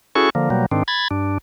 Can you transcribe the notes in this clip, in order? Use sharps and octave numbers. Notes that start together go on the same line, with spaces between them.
C#4 E4 F#4 G#4 A4 C#6
D3 F3 A#3
B2 F#3 G3 A#3
G#2 D#3 C4 D4
B5 G#6 A6
G2 D4